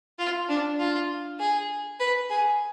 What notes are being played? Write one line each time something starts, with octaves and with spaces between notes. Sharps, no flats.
F4
D4
F4
G#4
B4
G#4